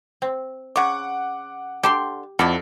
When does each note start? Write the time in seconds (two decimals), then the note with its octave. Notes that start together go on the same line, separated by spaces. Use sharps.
0.22 C4
0.76 C#3 F#5 C#6 D6
1.83 D3 G4 A5 C6
2.39 F2 E4 A4 D5 F#5